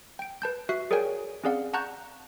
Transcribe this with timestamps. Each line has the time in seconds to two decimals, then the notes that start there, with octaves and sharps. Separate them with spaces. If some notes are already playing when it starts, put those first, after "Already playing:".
0.19 G5 D7
0.42 B4 A5 G6
0.69 F#4 E5 F#6 C7
0.91 G#4 A#4 C#5 D5 G5 G#5
1.44 C4 C#4 G#4 D5 F5 F#5
1.73 F#5 A5 A#5 C#6 F#6 G6